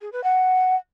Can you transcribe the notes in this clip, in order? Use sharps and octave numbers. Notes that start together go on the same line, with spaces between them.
G#4
B4
F#5